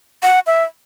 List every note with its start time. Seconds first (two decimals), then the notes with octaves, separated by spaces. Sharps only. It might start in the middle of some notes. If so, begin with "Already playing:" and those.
0.23 F#5
0.47 E5